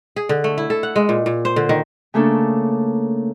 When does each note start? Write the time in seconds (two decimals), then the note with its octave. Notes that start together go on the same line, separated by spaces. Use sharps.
0.16 G#4
0.29 D3
0.44 A3
0.58 E4
0.70 A4
0.83 F#5
0.96 G#3
1.09 A#2
1.26 A#2
1.45 C5
1.56 D3
1.69 D#3
2.14 C#3 A3 A#3 D4 A4